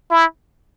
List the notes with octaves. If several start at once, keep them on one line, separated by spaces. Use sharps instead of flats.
E4